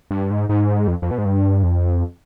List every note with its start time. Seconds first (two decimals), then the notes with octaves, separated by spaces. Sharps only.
0.11 G2
0.31 G#2
0.49 G#2
0.88 F2
1.02 F2
1.11 B2
1.18 G#2
1.25 G2
1.63 F2